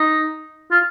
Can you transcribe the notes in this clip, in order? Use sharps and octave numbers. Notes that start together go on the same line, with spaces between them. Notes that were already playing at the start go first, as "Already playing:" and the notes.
Already playing: D#4
F4